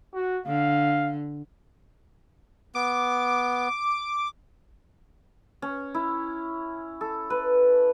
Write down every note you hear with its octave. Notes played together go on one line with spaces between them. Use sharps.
F#4
D3 F5
B3 D6
C#4
E4
A4
B4